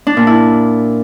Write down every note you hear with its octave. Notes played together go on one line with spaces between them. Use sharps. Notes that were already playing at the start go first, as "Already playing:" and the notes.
D4
A#2
E4